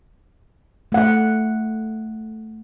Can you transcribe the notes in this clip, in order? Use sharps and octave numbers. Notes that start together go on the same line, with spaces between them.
A3 F#5